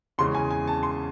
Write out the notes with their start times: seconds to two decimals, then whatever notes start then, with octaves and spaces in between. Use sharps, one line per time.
0.18 E2 C#3 G#3 C#4 C6
0.35 G#5
0.51 G#5
0.67 A5
0.83 C6